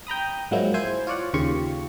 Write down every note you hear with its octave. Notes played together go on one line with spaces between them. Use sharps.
G5 A#5 B5 D#6
G#2 F3 F#3 G#3 A#3 E4
E4 C5 G#5
F4 C#5 D5 F#5
D#2 C#3 F4 G4 C#6